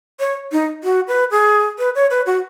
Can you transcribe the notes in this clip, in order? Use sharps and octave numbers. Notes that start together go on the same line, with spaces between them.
C#5
D#4
F#4
B4
G#4
B4
C#5
B4
F#4